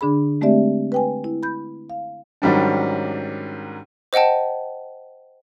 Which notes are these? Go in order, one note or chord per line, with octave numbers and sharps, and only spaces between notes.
D3 D4 G#4 B5
G#3 A3 C4 G4 D5 E5
B4 G5 G#5
E4
B5 G6
F5
G#2 D#3 F#3 G3 C#4 D4
C5 D#5 F#5 G5 A5